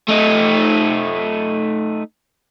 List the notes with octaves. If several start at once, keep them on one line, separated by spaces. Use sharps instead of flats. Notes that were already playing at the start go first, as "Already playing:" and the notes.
A3 D#4